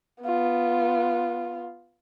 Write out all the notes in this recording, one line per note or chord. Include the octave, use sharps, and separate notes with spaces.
B3 F4